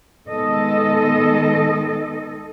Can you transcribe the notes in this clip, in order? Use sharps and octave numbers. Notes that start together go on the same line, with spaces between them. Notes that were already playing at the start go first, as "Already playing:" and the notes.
D#3 G#3 B3 A4 D#5